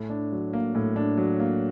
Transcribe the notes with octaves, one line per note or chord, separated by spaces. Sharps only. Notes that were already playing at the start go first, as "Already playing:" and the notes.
Already playing: A2
D4
F#3
A#3
A2
D4
F#3
A#3